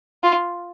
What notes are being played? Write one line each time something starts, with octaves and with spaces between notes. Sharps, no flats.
F4